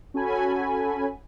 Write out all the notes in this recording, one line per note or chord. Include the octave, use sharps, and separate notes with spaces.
C#4 F#4 A4 G#5 B5